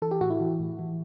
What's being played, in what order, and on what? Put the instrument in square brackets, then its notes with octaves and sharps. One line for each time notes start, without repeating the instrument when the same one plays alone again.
[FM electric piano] E3 A4
G4
A2 F#4
E4
E3
A2
E3